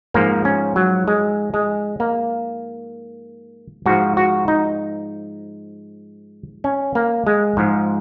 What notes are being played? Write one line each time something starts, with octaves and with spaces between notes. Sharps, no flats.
G#2 F3 A#3
C#4
F#3
G#3
G#3
A#3
G#2 F3 F#4
F#4
D#4
C#4
A#3
G#3
G#2 F3